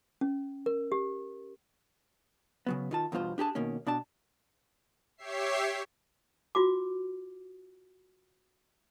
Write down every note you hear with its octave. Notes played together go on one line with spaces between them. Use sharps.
C#4
A#4
G4
C#3 F#3 B3
D#3 F4 A5
E2 G2 B2 F4 C5
D4 G4 G#4 A5
B2 D#3 A#3 C#4
B2 D4 D5 A5
G4 C#5 E5 C7
F4 F#4 D6